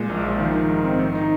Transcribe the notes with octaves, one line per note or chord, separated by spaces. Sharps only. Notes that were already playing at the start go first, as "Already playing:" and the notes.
Already playing: A#2 G#3
A#1
F3
D#3
D#4
G#2
C4
D#3
D#4